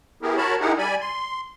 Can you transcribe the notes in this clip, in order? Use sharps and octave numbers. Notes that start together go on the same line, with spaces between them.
B3 E4 G4 G#4 A#4
F#4 A#4 C#5 A5 B5
D#4 E4 G4 G#4 A#4 F#5
G3 D5 G#5 B5
C6